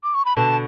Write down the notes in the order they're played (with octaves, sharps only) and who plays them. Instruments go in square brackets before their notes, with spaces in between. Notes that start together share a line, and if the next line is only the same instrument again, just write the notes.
[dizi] D6
C#6
B5
[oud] B2 D3 [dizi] A5